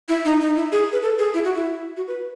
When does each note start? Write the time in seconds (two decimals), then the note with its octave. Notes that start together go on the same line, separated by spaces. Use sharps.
0.09 E4
0.25 D#4
0.41 D#4
0.56 E4
0.72 G#4
0.92 B4
1.02 A4
1.19 G#4
1.34 E4
1.45 F#4
1.55 E4
1.97 F#4
2.08 B4